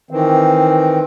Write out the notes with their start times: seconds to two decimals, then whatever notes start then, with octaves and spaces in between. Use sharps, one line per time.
0.11 D#3 E3 C4